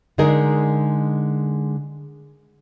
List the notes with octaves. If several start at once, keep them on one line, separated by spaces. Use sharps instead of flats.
D3 G#3 D#4 G#4 A#4